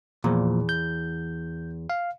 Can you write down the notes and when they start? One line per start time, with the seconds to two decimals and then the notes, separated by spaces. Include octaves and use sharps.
0.24 E2 A#2 F3
0.69 G6
1.90 F5